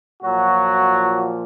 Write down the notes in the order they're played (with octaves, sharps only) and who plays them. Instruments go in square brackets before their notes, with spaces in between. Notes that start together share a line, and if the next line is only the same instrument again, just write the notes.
[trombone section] A#2 F3 F#3 F#4